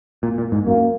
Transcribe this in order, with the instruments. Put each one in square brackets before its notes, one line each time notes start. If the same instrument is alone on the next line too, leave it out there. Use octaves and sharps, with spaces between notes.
[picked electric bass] A#2
A#2
G#2
[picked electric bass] F#2 [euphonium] A#3